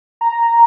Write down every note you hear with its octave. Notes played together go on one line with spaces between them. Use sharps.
A#5